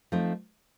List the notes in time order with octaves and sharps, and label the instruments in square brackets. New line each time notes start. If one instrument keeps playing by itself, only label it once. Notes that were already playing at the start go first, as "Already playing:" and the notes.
[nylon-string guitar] F3 A3 C4 D#4